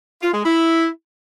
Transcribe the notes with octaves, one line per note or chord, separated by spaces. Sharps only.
F4
G#3
E4